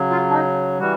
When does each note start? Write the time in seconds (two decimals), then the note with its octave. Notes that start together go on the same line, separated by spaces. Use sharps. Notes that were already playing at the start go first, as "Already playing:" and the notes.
Already playing: C#3 F#3
0.11 F4
0.30 D4
0.33 D#4
0.79 E3 G3 F#4